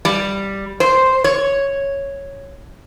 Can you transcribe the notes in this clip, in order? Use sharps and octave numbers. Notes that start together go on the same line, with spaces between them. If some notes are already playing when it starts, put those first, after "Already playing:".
G3
C5
C#5